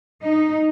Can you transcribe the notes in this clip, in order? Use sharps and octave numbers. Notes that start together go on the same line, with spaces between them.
D#4